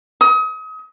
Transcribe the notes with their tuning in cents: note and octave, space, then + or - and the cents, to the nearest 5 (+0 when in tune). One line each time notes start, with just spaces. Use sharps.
D#6 +35